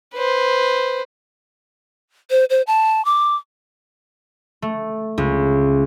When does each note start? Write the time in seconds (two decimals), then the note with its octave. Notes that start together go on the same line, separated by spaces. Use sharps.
0.14 B4 C5
2.31 C5
2.50 C5
2.67 A5
3.05 D6
4.62 A3
5.18 C#2